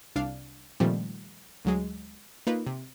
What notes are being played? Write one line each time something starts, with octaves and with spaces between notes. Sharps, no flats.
C2 D4 F5
A#2 D#3 F3 G3 A3 C4
D2 F#3 G#3
A#3 D#4 F4 B4
C3